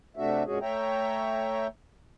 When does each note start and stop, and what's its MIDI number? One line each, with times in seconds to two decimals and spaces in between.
0.17 0.43 48
0.17 0.43 57
0.17 0.43 62
0.17 0.43 66
0.17 0.43 76
0.46 0.59 41
0.46 0.59 46
0.46 0.59 56
0.46 0.59 61
0.46 0.59 66
0.46 0.59 68
0.61 1.67 57
0.61 1.67 73
0.61 1.67 76
0.61 1.67 79
0.61 1.67 82